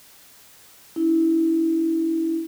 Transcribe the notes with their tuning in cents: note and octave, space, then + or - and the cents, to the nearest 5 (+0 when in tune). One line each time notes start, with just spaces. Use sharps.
C#4 +35 E4 -15